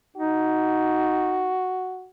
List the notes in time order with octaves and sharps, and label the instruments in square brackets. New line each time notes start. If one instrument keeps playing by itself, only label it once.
[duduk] D#4 [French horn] F#4